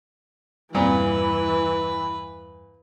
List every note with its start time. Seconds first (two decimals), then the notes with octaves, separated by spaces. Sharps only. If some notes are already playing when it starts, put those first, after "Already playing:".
0.75 E2 G2 A#2 E3 G3 C4 B4